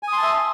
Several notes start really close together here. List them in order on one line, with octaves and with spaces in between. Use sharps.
G#5 D#6 C6 A5 E5